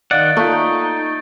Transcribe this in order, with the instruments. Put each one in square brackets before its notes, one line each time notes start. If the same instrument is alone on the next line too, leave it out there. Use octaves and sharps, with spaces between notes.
[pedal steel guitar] D#3 F#5 [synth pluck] D5 D#5 F5 [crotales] A6 D7
[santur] A3 [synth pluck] A#3 F4 [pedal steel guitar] D#4 [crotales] G6